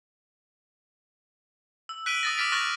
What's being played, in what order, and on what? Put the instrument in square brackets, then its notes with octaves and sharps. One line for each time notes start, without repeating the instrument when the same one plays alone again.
[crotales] E6
F#6 B6 D7 D#7 F#7 G7
D#6 A6 A#6
D6 D#6 F6 A6 B6 D7
C#6 F6 F#6 A6 A#6 F#7